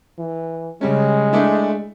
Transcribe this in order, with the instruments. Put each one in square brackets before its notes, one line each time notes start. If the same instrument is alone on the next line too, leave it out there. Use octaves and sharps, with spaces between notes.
[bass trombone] E3
[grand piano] C#3 G3 C#4 [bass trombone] G#3
[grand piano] A3 D4 E4